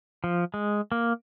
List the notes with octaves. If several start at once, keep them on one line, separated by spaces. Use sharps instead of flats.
F3
G#3
A#3